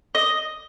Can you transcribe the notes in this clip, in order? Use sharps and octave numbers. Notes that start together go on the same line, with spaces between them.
D#5